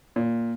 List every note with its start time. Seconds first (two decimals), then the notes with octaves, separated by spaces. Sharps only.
0.16 A#2